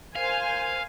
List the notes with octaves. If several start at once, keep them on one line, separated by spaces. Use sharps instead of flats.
A#4 C5 F5 G#5